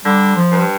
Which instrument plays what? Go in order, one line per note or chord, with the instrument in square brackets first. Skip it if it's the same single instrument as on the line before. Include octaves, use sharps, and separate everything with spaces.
[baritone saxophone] D3 [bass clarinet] G3
[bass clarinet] F3
[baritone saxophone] G2